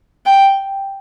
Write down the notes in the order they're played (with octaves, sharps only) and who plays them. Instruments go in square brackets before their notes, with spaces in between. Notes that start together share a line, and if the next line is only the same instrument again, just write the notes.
[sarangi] G5